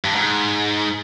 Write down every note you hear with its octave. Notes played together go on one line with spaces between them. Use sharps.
G2
G#2